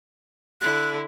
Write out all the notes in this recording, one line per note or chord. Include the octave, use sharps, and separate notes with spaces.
D3 E4 F#6